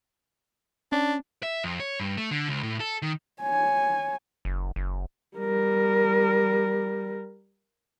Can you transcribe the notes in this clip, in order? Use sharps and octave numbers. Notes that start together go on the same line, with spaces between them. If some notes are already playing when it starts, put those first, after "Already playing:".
C#4 D4
E5
F2
C#5
G2
A3
D3
C#2
A2
A4
D#3
C#5 G#5
F#1
F#1
G3 A#4